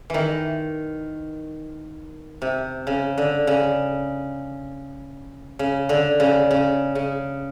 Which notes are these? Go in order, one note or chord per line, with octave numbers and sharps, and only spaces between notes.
D#3 E3
C3
C#3
D3
C#3
C#3
D3
C#3
C#3
C#3